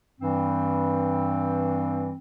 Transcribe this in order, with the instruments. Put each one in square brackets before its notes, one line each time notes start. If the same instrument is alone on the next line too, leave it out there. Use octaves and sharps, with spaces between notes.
[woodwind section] G2 E3 G3 C4